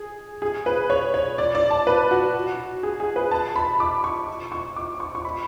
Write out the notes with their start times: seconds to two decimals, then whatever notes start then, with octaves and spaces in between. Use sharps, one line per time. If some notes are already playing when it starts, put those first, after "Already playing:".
Already playing: G#4
0.42 G#4
0.66 B4
0.90 C#5
1.14 C#5
1.38 D5
1.55 D5
1.71 A5
1.87 B4
2.11 F#4
2.83 G#4
3.00 G#4
3.16 B4
3.31 A5
3.56 B5
3.80 D6
4.04 C#6
4.52 C#6
4.76 D6
5.00 C#6
5.15 C#6
5.25 B5